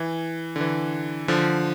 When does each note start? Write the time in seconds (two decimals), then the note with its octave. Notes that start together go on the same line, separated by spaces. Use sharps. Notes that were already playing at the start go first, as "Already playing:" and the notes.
Already playing: E3
0.56 D3
0.61 E3
1.28 D3 F3